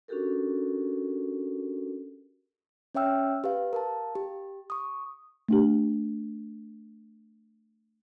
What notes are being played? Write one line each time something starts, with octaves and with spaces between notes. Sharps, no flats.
C#4 D4 F#4 G4 A4 A#4
C#4 C#5 E5 G5 E6 F6
G4 B4 F5
A#4 F5 A5
G4
C#6 D#6
A3 D4 G4